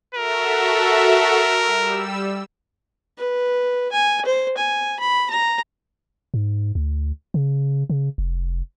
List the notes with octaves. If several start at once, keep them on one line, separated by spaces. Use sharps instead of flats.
F#4 A4 A#4 E5
G3 E6
B4
G#5
C5
G#5
B5
A#5
G#2
D2
C#3
C#3
F1